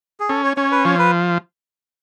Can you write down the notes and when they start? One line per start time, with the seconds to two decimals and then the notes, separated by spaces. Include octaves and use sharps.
0.20 G#4
0.29 C#4 A4
0.44 C#5
0.57 C#4 C#5
0.72 B4
0.84 F3 C#5
0.99 B4